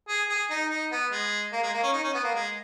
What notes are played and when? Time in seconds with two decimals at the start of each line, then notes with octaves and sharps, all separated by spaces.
0.09 G#4
0.30 G#4
0.51 D#4
0.70 D#4
0.92 B3
1.12 G#3
1.53 A#3
1.63 G#3
1.73 A#3
1.83 C#4
1.93 D#4
2.03 C#4
2.14 B3
2.24 A#3
2.35 G#3